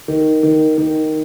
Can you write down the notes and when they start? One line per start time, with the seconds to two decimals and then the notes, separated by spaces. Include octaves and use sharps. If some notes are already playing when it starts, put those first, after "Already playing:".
0.08 D#3
0.43 D#3
0.78 D#3